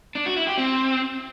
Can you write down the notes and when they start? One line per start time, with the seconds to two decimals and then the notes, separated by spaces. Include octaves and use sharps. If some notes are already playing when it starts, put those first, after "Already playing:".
0.15 D4
0.26 F#4
0.36 E4
0.47 G4
0.58 C4